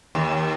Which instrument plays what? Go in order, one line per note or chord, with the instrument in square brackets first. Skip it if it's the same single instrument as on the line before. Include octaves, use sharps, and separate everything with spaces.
[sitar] D#2